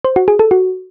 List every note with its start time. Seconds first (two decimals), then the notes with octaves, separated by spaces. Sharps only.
0.05 C5
0.16 F#4
0.28 G#4
0.39 A4
0.51 F#4